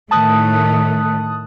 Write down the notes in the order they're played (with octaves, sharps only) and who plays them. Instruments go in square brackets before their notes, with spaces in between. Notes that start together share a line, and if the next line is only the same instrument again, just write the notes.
[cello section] A2 D#3 A3 [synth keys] A5 D#6 F#6